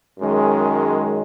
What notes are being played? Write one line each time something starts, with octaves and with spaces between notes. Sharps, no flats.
F#2 D#3 G#3 C#4